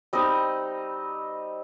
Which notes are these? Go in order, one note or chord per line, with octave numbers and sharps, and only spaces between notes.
G3 C4 D#4 D#5